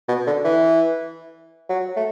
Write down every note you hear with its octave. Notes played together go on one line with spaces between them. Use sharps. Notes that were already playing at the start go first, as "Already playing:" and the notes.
B2
D3
E3
F#3
A3